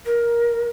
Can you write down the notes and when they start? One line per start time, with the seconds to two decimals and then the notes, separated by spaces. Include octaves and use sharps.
0.05 A#4